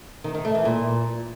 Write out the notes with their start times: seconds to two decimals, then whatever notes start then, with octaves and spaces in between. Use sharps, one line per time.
0.24 D#3
0.34 D#3
0.45 A3
0.55 E3
0.65 A#2